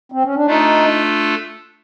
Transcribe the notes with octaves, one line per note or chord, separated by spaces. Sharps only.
C4
C#4
D4
A3 D4 D#4 F4 A4